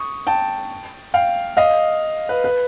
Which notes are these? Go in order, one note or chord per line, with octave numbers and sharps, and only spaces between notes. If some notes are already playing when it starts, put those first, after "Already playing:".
Already playing: C#6 D#6
G5 A5
F5 G5
D#5 F5
B4
B4